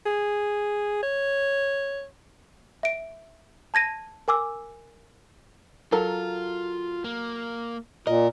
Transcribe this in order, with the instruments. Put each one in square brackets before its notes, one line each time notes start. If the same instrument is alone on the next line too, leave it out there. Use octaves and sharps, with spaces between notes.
[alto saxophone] G#4
C#5
[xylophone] E5 D7
A5 G#6 A#6 D#7
A#4 G#5 D6 E6
[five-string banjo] F#3 A4 A#4 [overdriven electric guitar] F4
[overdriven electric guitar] A#3
[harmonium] A#2 [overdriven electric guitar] A#4 [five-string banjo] D#5